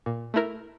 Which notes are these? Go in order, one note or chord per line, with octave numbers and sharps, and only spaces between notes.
A#2
A3 E4 A#4